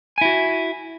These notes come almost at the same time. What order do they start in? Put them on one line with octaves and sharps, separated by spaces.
G#5 E4 F#4